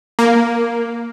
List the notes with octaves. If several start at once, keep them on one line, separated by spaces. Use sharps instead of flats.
A#3